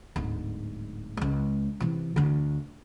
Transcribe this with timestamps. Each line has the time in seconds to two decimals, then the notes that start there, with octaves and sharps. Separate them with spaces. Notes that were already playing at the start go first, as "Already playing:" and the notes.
0.16 D1 G#2
1.17 C#2 G#3
1.80 C3 E3
2.16 D2 D3